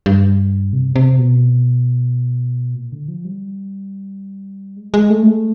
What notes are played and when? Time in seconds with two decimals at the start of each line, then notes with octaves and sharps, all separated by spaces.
0.06 G2
0.73 C3
0.96 C3
1.19 B2
2.75 A#2
2.92 D3
3.08 F3
3.25 G3
4.76 G#3
4.94 G#3
5.10 A3
5.23 G#3
5.27 A3